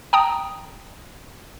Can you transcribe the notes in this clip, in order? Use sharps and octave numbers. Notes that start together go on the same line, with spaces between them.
G5 A5 A#5 D#6